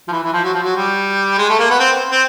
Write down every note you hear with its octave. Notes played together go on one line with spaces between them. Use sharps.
F3
E3
E3
F3
F#3
F3
F#3
G3
G#3
A3
A#3
B3
C4
C4